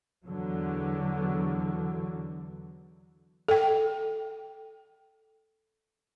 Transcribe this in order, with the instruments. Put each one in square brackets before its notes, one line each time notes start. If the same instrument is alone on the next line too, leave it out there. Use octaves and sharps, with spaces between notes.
[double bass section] E2 D3 F#3
[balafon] A4 G5